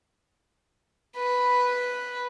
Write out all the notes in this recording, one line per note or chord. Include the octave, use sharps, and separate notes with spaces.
B4